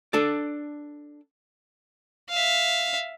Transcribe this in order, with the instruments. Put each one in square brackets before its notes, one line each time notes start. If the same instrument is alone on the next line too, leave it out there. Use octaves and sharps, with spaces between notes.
[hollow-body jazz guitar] D4 A4 D5
[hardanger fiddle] E5 F5